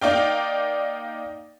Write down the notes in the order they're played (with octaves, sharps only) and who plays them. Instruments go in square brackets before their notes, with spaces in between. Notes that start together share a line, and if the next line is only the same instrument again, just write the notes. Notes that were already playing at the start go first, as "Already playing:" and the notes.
[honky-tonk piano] A#3 D#4 D5 F5 G5